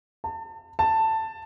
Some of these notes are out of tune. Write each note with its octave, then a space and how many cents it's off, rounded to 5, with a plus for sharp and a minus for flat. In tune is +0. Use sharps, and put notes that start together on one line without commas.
A5 +35
A5 +10